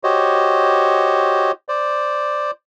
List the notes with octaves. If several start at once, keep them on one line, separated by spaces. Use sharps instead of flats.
F#4 G4 C5 C#5 D#5
C5 D5